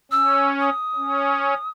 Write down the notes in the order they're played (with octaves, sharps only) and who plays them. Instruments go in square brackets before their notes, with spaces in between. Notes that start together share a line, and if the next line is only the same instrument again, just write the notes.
[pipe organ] C#4 [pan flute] E6
[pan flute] D#6
[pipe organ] C#4